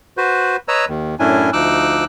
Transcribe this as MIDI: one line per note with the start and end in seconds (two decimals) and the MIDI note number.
0.17 0.56 66
0.17 0.56 71
0.17 0.56 72
0.68 0.85 71
0.68 0.85 73
0.68 0.85 75
0.68 0.85 82
0.68 0.85 88
0.89 1.15 39
0.89 1.15 51
1.20 1.50 42
1.20 1.50 45
1.20 1.50 61
1.20 1.50 62
1.20 1.50 64
1.20 1.50 80
1.53 2.05 38
1.53 2.05 53
1.53 2.05 63
1.53 2.05 86
1.53 2.05 88
1.53 2.05 90